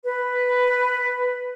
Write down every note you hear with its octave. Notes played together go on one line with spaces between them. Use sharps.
B4